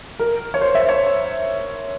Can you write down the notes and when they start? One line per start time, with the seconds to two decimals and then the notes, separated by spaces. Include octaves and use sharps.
0.20 A#4
0.54 C#5
0.61 C5
0.75 E5
0.89 C#5